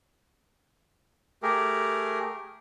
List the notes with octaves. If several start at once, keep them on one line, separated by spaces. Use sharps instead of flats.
A3 G4 G#4 A#4